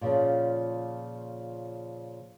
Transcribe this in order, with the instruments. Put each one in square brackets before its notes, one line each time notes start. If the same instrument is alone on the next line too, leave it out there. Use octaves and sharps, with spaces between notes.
[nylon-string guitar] A#2 C#3 F3